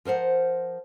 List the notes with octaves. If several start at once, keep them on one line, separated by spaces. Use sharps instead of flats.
F3 A#4 C5 F#5